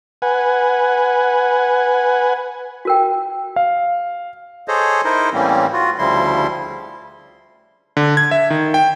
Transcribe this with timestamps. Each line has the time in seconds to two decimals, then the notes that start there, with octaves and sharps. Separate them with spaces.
0.22 B4 F#5 G#5
2.85 F#4 A#4 G5
3.56 F5
4.68 G#4 A4 C5 C#5 D#5
5.05 D#4 E4 A#4 C5 D#5
5.33 A2 E3 G3 A#3 C4 C#4
5.73 F4 F#4
5.99 D2 C#3 F3 G3 E4 C6
7.97 D3
8.17 G#6
8.31 E5
8.50 D#3
8.74 G5